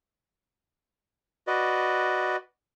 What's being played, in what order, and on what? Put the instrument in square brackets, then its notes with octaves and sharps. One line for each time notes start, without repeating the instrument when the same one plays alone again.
[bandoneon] F#4 B4 D5 D#5